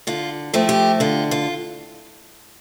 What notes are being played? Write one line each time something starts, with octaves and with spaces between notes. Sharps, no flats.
D3 F4
F3 A3 C4
G4
D3 F4
F4